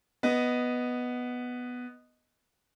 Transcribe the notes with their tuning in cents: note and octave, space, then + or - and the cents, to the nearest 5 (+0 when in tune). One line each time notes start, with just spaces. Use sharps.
B3 +0 D#5 +0